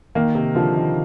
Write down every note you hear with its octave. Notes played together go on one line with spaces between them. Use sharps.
D#3 A#3
C3
D3 F3
D#3